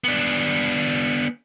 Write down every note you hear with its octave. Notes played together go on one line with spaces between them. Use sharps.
B3 D4